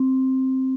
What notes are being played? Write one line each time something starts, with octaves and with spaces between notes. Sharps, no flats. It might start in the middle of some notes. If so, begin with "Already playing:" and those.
Already playing: C4